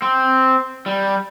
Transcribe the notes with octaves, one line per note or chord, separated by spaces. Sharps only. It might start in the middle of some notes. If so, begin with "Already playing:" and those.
C4
G3